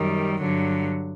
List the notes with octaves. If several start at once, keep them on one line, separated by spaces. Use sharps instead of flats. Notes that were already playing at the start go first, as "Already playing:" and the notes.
Already playing: F#2 D#3 G3
G2 D3 F#3